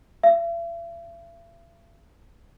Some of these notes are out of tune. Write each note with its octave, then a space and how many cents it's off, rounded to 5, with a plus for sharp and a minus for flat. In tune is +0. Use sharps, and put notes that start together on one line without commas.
E5 +45